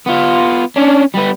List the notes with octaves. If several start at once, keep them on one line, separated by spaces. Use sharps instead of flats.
B3 F4
C#4 D4
G3 B3